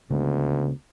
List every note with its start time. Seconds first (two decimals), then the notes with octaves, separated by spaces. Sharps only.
0.10 D2 C#3 G#3 B3